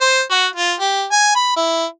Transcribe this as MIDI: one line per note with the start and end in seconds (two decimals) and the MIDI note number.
0.01 0.22 72
0.31 0.46 66
0.56 0.74 65
0.80 1.05 67
1.12 1.33 80
1.36 1.53 83
1.56 1.85 64